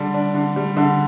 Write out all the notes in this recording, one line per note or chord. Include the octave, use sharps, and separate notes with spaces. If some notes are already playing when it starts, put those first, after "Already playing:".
Already playing: D3 G3
D4
D3
G3
D3